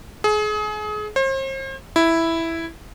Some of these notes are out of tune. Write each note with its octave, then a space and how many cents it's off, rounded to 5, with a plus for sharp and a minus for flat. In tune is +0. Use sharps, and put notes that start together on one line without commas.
G#4 +30
C5 +40
E4 +0